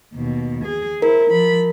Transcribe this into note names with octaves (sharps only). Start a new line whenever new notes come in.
D#2 B2
G#4
E4 A#4 C5
F3 B5